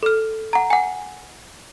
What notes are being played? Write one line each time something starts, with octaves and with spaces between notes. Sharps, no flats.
A4 F6
F#5 A#5
F#5 G#5